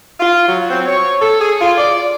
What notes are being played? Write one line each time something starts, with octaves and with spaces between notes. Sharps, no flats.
F4
F#3
C4
C#5
A4
G#4
F4
D5